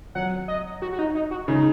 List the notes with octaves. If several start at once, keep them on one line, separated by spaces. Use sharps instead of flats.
F#3 F#5
D#5
F#4
F#4
D#4
D#4
F#4
C#3 D#4